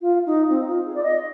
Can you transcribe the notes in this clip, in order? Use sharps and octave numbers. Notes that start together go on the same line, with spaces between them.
F4
D#4
C4
F4
G#4
D5
D#5